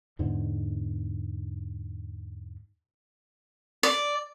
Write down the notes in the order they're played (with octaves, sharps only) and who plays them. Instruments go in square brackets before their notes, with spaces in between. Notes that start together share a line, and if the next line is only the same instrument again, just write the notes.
[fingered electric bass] E2 G#2 B2 D3
[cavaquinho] D5